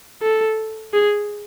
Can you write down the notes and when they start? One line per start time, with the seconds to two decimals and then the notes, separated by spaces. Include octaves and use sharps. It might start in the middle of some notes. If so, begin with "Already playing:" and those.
0.22 A4
0.94 G#4